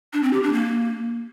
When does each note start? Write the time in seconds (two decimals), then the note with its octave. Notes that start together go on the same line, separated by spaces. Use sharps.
0.13 D4
0.23 C4
0.33 G4
0.43 D4
0.53 A#3